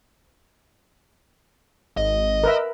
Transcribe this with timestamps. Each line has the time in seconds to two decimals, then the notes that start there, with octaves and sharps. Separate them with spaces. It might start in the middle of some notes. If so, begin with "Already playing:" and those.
1.97 G#1 D#5
2.44 A#4 B4 E5